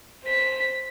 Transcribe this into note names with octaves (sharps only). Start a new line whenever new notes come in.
C5 B6